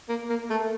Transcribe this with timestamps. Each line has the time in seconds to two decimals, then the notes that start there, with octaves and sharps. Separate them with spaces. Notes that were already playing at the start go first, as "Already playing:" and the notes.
0.09 A#3
0.30 A#3
0.50 A3